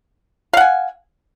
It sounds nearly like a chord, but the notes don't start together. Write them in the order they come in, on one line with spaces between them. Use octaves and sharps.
F5 F#5 G#5